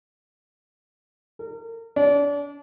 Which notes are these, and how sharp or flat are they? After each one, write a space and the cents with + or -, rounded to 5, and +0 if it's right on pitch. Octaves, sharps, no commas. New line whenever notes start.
A#4 -35
D4 -35